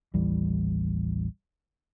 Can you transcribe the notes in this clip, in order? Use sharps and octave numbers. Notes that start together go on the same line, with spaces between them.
A1 D#2 E3 G3